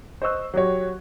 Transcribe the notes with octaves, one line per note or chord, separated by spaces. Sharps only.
C5 D#5 C#6 E6 F#6
F#3 F#4 G4 C#5